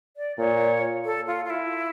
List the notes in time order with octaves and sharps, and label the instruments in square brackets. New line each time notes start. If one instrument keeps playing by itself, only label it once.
[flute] D5
[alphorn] A#2 [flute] C#5
[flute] A4
F4
F4
E4